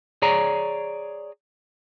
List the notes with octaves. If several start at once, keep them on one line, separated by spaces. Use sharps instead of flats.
G#4 C#5 D5 A#5